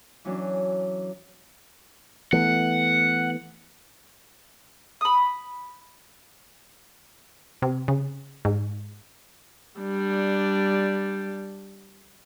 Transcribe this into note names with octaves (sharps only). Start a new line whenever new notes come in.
E3 F#3 C#4 D4
E3 A3 B3 F#5
B5 D#6
C3
C#3
G#2
G3 D4